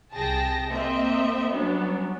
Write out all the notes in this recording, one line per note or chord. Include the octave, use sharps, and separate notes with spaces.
C2 G#4 G5 A5 A#6
A#3 C4 D#5 E5
F#3 G3 B3 C#4 D4